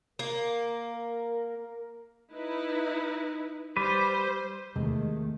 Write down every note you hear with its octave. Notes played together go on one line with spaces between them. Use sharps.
A#3 A#4
D#4 E4 B4
G3 B4 C5
E2 C3 D#3 G#3 A3